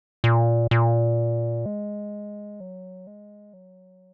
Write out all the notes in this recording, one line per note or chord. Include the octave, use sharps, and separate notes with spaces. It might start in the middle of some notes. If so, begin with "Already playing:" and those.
A#2
A#2
G#3
F#3
G#3
F#3